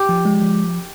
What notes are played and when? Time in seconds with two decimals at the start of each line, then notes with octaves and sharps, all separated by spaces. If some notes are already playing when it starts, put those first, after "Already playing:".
Already playing: G4
0.09 F3
0.25 G#3
0.41 F3